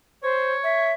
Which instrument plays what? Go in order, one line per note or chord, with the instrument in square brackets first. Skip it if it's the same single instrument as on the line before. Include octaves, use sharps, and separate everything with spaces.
[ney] C5 [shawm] C#5
[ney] E5